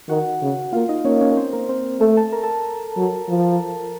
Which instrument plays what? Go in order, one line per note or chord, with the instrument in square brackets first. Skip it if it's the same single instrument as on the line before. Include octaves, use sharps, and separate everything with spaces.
[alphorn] D#3 [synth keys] F#4 F#5
[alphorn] C#3
[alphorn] A#3 [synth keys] F4 F5
[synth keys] D#4 D#5
[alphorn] A#3 [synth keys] C#4 C#5
[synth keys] C#4 C#5
A#4
C4 C5
A#3 A#4
C4 C5
[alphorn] A3 [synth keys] A4 A5
[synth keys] A4 A5
A#4 A#5
A4 A5
[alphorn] F#3
F3